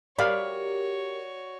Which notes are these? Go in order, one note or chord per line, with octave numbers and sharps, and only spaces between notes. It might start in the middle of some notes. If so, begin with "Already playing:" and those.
F#4 G4 A#4 C#5 D5 F5 B5